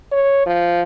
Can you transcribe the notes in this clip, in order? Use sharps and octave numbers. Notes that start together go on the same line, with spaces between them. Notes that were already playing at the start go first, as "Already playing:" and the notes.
C#5
F3